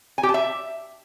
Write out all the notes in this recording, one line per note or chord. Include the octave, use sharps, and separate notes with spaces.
G#5
G4
A5
E5